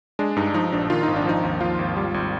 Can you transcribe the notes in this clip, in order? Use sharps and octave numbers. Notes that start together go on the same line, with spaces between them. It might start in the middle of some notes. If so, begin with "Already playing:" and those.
G#3 D4
G2 D#4
F3 D#4
A#1 D4
D#3 F4
G#1 D#4
D4
F3 D#4
D#2
F3 F4
G#1
G3
G#1